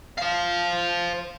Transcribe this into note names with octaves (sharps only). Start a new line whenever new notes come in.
C5 F5